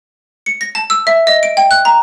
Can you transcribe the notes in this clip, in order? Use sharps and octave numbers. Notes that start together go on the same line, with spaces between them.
C#7
A#6
A5
E6
E5
D#5
D7
G5
F#6
A#5